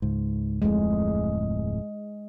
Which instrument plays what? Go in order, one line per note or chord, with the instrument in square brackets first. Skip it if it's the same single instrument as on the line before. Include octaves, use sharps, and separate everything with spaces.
[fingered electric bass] C#2 G#2
[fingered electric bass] D1 F2 A2 [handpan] G#3